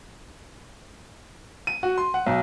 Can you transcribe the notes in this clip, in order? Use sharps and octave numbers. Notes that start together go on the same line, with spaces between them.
D#7
F#4
C6
F#5
B1